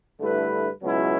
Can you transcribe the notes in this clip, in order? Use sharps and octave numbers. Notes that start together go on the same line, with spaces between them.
G2 D3 A3 E4 B4
C#2 B2 F#3 C#4 E4